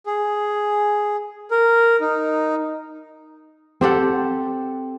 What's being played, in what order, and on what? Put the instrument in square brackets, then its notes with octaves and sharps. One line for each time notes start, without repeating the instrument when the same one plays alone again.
[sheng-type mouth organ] G#4
A#4
D#4
[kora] C4 G4 A4 F#5